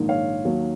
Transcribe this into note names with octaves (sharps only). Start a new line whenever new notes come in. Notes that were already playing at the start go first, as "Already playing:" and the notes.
Already playing: A#1 G#2 D#3 A#3
C#5 F5
D#2 D#3 F#3 A#3